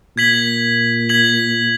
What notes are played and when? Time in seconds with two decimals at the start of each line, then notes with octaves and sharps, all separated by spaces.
0.16 A#2 G#6 B6 F#7
1.09 G#6 B6 F#7